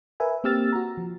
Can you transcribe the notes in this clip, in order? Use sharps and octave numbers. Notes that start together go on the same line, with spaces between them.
A#4 B4 E5 G#5
A#3 C4 G4 E6 F6 A6
F#4 A#5
F3